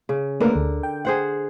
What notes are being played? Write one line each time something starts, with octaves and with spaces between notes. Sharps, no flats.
C#3
D3 A3 A#3 A#4 B4
D2
G5
G#4 C5 F#5